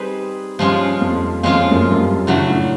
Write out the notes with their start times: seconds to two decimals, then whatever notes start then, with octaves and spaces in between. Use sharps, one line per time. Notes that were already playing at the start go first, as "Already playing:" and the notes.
Already playing: G3 C4 D#4 G#4 B4
0.59 G2 F3 G#3 C#4 F4
1.01 F2
1.43 F2 F3 G#3 C#4 F4
1.71 F#2
1.91 F#2
1.99 G2
2.27 A2 C#3 F#3 A3 D4
2.49 A2